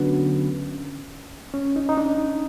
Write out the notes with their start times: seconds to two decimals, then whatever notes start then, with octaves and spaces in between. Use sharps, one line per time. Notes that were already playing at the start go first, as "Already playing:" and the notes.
Already playing: D3 F#3 B3 C#4 D4
1.54 C#4
1.76 D#4
1.89 D#4
1.97 D4